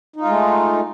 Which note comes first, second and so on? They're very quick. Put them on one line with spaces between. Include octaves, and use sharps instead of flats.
D#4 F4 G#3 A3